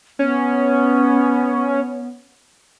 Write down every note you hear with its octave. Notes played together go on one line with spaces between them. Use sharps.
B3 C#4